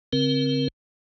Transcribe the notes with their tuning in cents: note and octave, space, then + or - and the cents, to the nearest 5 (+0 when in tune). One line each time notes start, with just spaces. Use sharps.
D3 -40 C4 +5 A#4 +25